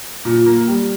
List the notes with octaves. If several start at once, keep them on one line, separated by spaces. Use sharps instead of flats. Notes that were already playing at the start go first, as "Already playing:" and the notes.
A#2
A#3
G3